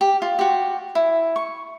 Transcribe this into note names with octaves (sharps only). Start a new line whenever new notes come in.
G4
F4
F#4 G4
E4
C#6